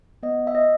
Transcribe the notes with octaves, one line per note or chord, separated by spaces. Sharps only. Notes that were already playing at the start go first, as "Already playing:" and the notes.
B3 D#5
E5
D#5